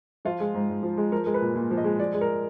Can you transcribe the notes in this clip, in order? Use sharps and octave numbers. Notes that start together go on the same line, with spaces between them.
F3 F4
G#3
G#2
G#2
F3
G#3
F3 A#4
G#3 A#4
B4
A#2
A#2
F3
D#5
G#3
F3 D5
G#3
A#4